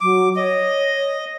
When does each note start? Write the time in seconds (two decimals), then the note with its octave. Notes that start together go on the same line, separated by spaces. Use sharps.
0.01 F#3 D6
0.36 C#5 D#5